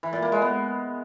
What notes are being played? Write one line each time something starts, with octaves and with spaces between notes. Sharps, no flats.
E3
A#2
A#3
G#3
B3